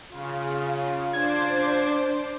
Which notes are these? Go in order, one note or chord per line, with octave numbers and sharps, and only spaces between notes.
C#3 F4
D4 C5 D6 G#6